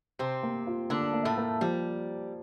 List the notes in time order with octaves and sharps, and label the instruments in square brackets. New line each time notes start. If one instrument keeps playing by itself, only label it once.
[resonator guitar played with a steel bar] C3 C4 [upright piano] C5
[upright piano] A#3
F4
[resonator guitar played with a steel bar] D3 D4 [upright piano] A#3
[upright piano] A#3
[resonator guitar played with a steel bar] A2 A3
[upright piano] A#3
[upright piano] F3 [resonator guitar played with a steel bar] G3